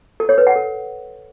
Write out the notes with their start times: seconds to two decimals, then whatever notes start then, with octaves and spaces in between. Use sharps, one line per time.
0.20 A4
0.29 C#5
0.38 B4
0.47 F#5
0.56 A4